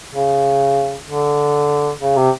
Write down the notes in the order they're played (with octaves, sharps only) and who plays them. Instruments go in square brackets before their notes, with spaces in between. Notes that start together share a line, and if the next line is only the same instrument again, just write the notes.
[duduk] C#3
D3
C#3
C3